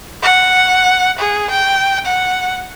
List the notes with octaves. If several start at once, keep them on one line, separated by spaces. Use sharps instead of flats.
F#5
G#4
G5
F#5